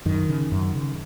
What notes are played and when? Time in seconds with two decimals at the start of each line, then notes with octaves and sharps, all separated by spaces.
0.06 F#2 D#3
0.29 C#3
0.52 F#2
0.74 C#3